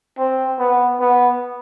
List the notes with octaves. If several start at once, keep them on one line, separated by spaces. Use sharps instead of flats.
C4
B3
B3